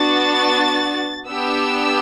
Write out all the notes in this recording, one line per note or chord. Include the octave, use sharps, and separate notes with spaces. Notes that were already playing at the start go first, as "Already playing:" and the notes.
Already playing: B3 D4 F#4 A6
B3 D4 G4 E6